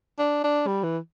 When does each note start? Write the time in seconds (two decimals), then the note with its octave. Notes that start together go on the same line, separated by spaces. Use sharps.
0.19 D4
0.44 D4
0.67 G3
0.83 E3